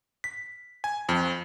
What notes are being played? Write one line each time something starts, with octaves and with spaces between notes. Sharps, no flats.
B6
G#5
F2